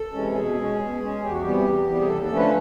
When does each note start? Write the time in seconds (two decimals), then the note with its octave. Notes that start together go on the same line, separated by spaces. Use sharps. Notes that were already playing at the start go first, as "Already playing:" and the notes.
Already playing: A4
0.13 C3 E3 G#3 C#4
0.35 B2 G#4
0.56 G#3 C#4
0.78 B2
1.00 G#3 C#4
1.21 E2 G4
1.31 F#4
1.42 C3 E3 G3 B3 G4
1.65 E2
1.87 C3 E3 G3 B3
2.00 G#4
2.07 D#2 A4
2.22 A4
2.29 D3 F3 A3 C#4
2.37 B4